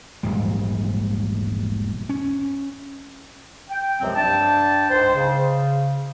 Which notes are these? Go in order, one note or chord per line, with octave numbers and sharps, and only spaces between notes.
E1 A#1 G#2 G3
C#4
G5
C#2 F#2 C3 F3 F#3 C4
G2 D4 G5 A5
C#2 G#2 G#3 C5
C#3